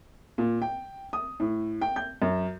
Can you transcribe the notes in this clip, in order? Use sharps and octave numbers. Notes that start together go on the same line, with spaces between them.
A#2
G5
D#6
A2
G5
G6
F#2